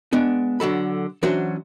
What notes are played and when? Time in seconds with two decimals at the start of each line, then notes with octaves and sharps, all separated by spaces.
0.13 G#3 B3 D4
0.60 D3 F#3 A4 B5
1.23 E3 F#3 C#4 D4 F#4 C5